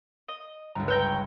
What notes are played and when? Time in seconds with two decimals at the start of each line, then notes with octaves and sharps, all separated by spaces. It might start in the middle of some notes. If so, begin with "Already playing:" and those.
0.28 D#5
0.75 G1 C#2 A#5
0.88 B4 C#5 G5 A#5 E6